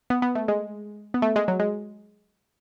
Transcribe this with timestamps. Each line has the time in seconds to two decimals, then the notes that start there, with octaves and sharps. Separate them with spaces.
0.10 B3
0.22 B3
0.35 A3
0.48 G#3
1.14 B3
1.22 A3
1.36 G#3
1.48 F#3
1.60 G#3